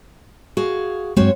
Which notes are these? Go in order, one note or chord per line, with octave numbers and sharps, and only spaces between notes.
F#4 G#4 F5
G2 F#3 G#3 C4 F#4 C#5